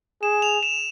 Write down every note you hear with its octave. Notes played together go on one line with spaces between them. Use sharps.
G#4 E7
F7
E7